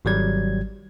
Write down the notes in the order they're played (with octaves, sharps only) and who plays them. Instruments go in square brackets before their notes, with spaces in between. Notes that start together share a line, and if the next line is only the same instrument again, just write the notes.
[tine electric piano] G#1 F#3 G3 G#6